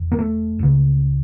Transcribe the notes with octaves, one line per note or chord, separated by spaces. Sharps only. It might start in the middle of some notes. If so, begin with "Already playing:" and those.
Already playing: E1 E2
A#3
A3
C#2 C#3